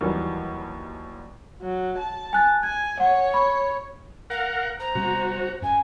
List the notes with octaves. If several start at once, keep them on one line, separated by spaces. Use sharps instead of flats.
D#2 E3 F#3 G3
F#3
A5
G#5 F#6 A6
G#5 G#6
C#5 F#5
B5 C#6
A#4 F5 F#5
C5 A#5
C3 G3 B3 F#4
F#2 G#5